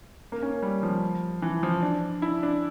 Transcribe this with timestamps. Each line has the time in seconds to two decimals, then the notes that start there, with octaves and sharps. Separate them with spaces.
0.32 A#3
0.43 C#4
0.63 G3
0.83 F3
1.42 E3
1.63 F3
1.82 D4
2.22 E4
2.43 D4